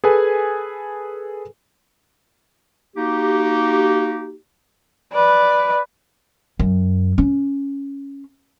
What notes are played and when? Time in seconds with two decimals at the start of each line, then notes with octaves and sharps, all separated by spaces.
0.04 G#4 A4 B4 G#5
2.96 A#3 D#4 F#4 G4
5.12 B4 D5
6.59 F#2
7.18 C#4